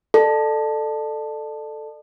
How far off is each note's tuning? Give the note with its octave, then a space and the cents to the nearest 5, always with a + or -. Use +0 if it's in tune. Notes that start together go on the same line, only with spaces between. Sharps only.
A4 +0 D5 +35